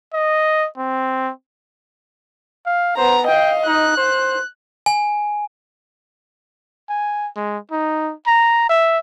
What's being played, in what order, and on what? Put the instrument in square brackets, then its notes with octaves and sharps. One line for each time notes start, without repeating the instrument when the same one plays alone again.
[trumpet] D#5
C4
[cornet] F5
[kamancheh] B3 A#5 [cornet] C5
[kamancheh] D#5 F5 [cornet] G5
[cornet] D#4 [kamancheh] F#6
[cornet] C5
[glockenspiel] G#5
[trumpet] G#5
G#3
D#4
A#5
E5